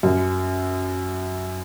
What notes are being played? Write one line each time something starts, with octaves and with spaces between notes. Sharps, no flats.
F#2